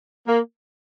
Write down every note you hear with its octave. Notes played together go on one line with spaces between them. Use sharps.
A#3